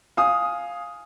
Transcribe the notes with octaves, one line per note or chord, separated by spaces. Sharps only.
F5 G#5 D#6